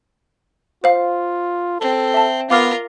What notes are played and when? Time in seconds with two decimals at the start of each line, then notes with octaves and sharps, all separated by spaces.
0.84 F4 C5 F5
1.80 C4 A4
2.14 E5 A5
2.50 B3 F4 A#4 F5 D6 F6